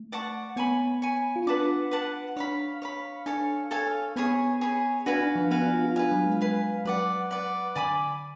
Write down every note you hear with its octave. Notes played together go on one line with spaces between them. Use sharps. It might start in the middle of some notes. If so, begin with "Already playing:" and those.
Already playing: A3
D5 F#5 A5 C#6
B3 C#5 G#5 B5
C#5 G#5 B5
F4
D4 B4 F#5 A5 D6
B4 F#5 A5 D6
D4 C#5 F5 B5
C#5 F5 B5
D4 A4 C#5 F5 G#5
A4 C#5 F5 G#5
B3 G#4 C#5 G#5 B5
G#4 C#5 G#5 B5
D4 F#4 B4 F5 G#5
D4
F3
B3 F#4 B4 F5 G#5
D4
F4
F4
D4 B4 F5 G#5
F#3
G#3
B4 F5 G#5
F#3 B4 D5 F#5
B4 D5 F#5
D3 D5 G#5 B5 D6